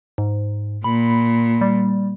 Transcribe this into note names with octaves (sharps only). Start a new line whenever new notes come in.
G#2
A#2 B5
G3